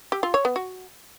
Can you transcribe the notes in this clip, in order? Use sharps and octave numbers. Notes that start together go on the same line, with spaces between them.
G4
F4
C#5
B3
F#4